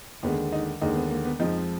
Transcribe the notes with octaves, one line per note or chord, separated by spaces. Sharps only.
D#2 D3 G#3 B3
D#4
D#2 D3 G#3 D#4
B3
A#3
B3
F2 F3 G#3 D#4